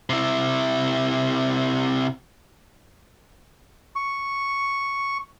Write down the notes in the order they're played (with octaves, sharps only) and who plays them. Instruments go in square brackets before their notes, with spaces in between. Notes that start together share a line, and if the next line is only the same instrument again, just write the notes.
[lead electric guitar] C3 E4
[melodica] C#6